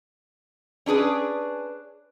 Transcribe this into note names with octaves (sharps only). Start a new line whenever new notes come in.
C#4 D4 G#4 B4